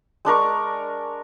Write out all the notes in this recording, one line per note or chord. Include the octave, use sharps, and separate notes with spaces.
G#3 D4 A#4 C#6